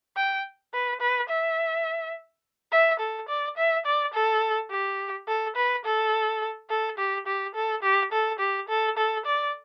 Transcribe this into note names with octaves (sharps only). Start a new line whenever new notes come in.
G5
B4
B4
E5
E5
A4
D5
E5
D5
A4
G4
A4
B4
A4
A4
G4
G4
A4
G4
A4
G4
A4
A4
D5